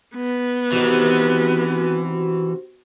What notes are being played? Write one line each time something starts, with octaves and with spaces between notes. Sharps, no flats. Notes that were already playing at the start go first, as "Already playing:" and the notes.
B3
C3 D#3 E3 F#4